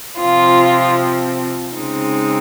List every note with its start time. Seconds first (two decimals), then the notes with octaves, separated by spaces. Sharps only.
0.20 C3 F3 C4 F4
1.76 C#3 G#3 C4 D#4